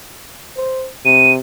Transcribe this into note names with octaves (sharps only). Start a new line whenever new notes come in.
C5
C3 D#7